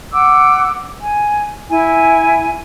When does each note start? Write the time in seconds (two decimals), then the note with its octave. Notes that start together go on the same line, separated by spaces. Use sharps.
0.13 F#5 D6 E6
1.02 G#5
1.69 E4 G#5